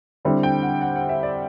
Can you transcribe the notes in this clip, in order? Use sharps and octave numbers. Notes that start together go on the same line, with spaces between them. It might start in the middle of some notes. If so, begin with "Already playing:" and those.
D3 G3 C4 E4
G5
F#5
F#5
F#5
E5
D5